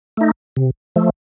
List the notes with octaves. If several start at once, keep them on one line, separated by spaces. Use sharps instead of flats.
A3 D#4
C3
F3 A3